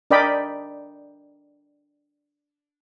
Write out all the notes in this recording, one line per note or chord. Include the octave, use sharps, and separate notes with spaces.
D4 A#4 D5 D#5 G5 B5